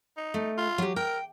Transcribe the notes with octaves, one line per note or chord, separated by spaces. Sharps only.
D#4
A3
F4
F#3 G4
A#4 G5